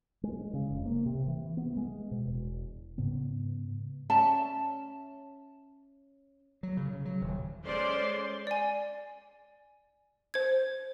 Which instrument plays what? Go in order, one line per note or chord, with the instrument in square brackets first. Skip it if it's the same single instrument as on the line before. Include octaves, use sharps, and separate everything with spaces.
[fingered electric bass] G#3
C#3
F1
A#3
C3
E3
B3
G#3
B2
E1
G#2 C#3 B3
[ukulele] C#4 D5 E5 A5
[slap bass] F#3
C#3
C#3
F#3
D#1
[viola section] G#3 A3 C#4 C5 D5 C6
[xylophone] D5 G#5
C5 G#6